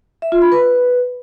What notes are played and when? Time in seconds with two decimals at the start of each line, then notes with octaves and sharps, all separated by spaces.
0.22 E5
0.32 F4
0.42 B5
0.52 B4